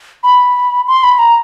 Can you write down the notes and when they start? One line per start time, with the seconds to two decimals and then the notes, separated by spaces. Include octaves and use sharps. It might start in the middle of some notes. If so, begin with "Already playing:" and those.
0.23 B5
0.87 C6
1.03 B5
1.19 A#5